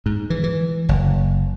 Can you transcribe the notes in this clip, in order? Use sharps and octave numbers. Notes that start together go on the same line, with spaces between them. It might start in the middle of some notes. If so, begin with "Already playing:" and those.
G#2
E3
E3
F#1